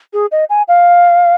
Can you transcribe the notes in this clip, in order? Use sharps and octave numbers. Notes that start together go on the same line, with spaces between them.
G#4
D#5
G#5
F5